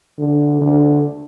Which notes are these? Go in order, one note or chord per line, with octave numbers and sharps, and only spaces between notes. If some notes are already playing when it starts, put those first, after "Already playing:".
D3
D3